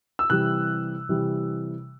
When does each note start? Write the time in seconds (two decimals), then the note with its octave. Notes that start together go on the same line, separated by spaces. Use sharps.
0.19 E6
0.30 C3 E3 G3 F#6
1.09 C3 E3 G3